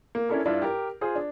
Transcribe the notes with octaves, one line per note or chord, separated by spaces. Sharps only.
A#3
C#4 D4 E4 A4 A#4
G2 D4 E4 F4
G4 A#4
F4 G#4 C5
D4